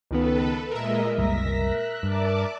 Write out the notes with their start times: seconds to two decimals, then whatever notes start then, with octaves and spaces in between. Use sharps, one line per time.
0.11 C#2 D#3 B3 A4 B4
0.71 A#2 G#3 A#4 D#5 E5
1.18 F#1 C2 G3 A#6 B6
1.59 F#6
2.03 G2 D5 A5 D6